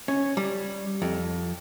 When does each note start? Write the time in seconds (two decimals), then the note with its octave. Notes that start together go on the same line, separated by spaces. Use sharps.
0.08 C#4
0.37 G3
1.02 F2